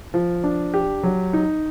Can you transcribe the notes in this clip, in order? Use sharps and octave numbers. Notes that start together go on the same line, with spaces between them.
F3
D4
G4
F#3
D#4